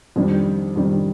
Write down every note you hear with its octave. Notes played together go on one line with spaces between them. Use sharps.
F2 D#3 G3 D4
F2 D#3 G3 D4